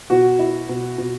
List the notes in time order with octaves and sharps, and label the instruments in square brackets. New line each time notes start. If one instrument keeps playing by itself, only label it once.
[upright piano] B2 [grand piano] F#4
[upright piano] E4
B2
B2